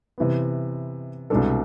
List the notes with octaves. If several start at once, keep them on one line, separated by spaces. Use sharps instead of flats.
C3 E3 B3
C2 B2 G#3 D4 A4